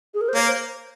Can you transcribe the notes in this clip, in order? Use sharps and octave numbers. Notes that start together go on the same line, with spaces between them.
G#4
A#4
C5
A#3 C#5
C5